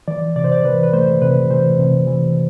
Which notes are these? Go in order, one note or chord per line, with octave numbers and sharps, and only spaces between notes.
E3 D5
C3 D5
C5
D5
E3 B4
B4
A3 C5
C3 B4
E3 C5
C3
E3